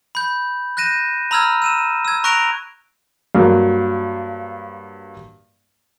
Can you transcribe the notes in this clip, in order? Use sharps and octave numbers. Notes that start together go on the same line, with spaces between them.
B5 G6
F#6 G6 A#6 D#7 E7
A#5 B5 E6 F6 G#6
E6 D#7 E7
E6 G#6
A#5 C#6 F#6 A#6 D7 F7
G2 F#3 A#3